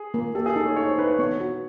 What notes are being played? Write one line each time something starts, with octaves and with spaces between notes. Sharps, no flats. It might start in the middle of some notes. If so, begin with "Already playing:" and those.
Already playing: G#4
A#3
G4 A4
G#4
D#4 A4
C#5
D#4 C#5
C5
D#4 B4
C#5
B3 C#5
F#4